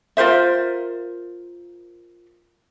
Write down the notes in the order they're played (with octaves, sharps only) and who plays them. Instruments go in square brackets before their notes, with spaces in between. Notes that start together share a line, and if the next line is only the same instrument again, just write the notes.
[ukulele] F4 A#4 C5 E5